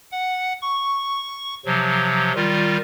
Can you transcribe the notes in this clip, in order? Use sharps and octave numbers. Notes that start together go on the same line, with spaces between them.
F#5
C#6
C3 F3 F#3
D#3 G3 F4